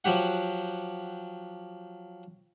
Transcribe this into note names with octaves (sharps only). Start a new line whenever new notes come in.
F3 F#3 G4 F#5